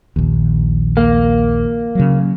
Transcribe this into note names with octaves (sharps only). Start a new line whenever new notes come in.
A#1 D#2
A#3
C#3 F#3